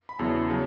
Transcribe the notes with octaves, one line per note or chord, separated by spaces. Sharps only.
B5
E2 C#3 F#3 B3 E4 A5
C#3 F#3